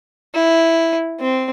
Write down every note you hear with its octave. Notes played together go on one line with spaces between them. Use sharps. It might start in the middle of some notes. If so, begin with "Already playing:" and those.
E4
C4